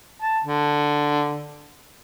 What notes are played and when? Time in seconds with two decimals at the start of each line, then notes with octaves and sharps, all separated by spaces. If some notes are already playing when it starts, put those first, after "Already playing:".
0.22 A5
0.45 D3